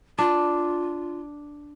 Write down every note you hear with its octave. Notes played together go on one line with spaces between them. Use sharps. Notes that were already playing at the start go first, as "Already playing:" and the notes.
D4 F4